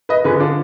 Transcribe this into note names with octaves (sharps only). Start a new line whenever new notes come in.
B4 D#5
D3 F3 G#4 B4
D4 F4